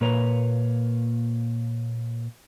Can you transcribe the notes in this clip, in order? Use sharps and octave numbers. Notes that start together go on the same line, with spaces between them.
A#2 A#3 B4 C#5 A#5